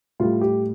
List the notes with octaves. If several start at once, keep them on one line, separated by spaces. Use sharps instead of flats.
A2 G3 F4
G4